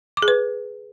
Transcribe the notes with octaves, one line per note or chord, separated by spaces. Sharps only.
D6
G#4
B4